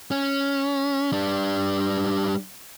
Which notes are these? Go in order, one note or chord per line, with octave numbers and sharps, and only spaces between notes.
C#4
G3 D4